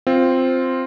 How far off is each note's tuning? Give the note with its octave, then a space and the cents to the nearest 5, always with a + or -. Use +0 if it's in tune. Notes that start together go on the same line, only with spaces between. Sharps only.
C4 +0 F4 +0